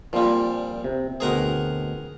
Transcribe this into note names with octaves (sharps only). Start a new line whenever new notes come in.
A#2 F3 G3 C4 F4
C3
D2 B2 C4 G#4 A#4 F#5